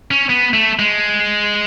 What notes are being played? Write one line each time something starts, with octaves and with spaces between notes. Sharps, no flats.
C#4
B3
A3
G#3